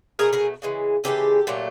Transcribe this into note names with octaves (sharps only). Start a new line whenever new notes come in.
B2 F#3 A3 G#4 A#4
G#4 A#4
C#3 E3 G#3
C#3 E3 G#3 G4 A4
A#2 F#3 A3